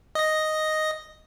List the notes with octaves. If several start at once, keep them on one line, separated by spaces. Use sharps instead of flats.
D#5 A#6